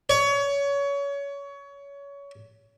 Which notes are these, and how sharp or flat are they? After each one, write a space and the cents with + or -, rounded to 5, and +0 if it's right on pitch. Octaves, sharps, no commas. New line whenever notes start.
C#5 +25